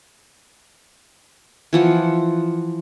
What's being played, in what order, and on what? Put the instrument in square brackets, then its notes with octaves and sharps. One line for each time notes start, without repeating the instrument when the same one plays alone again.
[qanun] E3 F3 F#5